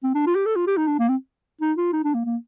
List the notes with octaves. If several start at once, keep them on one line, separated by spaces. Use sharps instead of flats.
C4
D4
F4
G4
A4
F4
G4
D#4
D4
A#3
C4
D#4
F4
D#4
D4
A#3
A#3